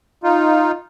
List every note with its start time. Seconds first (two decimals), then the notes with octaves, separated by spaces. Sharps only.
0.23 D#4 F4